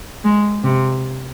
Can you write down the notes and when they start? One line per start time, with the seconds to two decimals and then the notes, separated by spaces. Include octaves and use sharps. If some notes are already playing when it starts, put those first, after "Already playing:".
0.24 G#3
0.64 C3